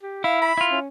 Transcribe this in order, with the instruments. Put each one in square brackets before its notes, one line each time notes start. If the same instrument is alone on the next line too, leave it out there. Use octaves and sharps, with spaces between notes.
[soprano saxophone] G4
[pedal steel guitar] E4 [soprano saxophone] F5
[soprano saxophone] B5
[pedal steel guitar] E4 F4
[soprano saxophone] C#4